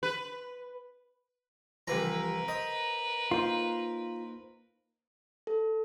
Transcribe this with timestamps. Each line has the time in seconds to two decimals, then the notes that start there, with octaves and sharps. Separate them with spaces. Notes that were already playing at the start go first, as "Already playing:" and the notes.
0.03 B4
1.87 C2 E3 F3 G4 A#4 B4 A#5
2.48 C5 D#5
3.31 A#3 D#4 F4 C5
5.47 A4